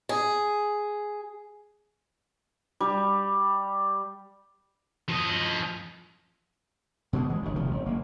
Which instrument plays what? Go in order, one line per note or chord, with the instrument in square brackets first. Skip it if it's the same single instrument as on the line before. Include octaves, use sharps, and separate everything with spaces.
[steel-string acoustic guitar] G#4
[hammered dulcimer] G3
[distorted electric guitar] F3 D#5
[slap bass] B2 D3 E3 G#3
E3 G#3
G1 D2
F1 C3 D#3 F3
G1
F#1 A#3